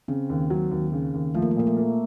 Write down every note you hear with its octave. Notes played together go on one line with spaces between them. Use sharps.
C#3 C4
D#2
F#3
D#2
C#3
D#2
F3 A3
A#3
A3
A#2 A#3
A3
A#3